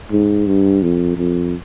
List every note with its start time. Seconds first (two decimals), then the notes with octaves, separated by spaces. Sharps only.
0.12 G#2
0.47 G2
0.82 F2
1.18 F2